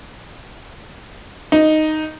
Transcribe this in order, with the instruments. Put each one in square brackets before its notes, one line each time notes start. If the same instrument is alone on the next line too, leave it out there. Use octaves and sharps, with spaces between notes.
[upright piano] D#4